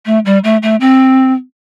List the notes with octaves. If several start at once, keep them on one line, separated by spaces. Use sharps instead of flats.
A3
G3
A3
A3
C4